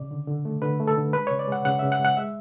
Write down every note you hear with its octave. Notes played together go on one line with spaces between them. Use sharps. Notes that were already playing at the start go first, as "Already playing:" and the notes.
Already playing: C#3 D5
D3
D3
A3
D3 B4
A3
A4
D3
G#3 B4
C#3 C#5
D5
G#3 F#5
C#3 F#5
C#3 E5
F#5
G#3
F#5
G#3 E5